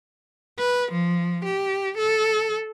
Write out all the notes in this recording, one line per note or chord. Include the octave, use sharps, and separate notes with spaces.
B4
F3
G4
A4